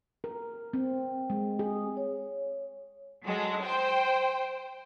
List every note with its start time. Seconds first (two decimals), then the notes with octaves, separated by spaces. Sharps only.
0.24 A#4
0.73 C4
1.30 G#3
1.59 G#4
1.97 C#5
3.25 F#3 G#3 A4
3.62 C5 G5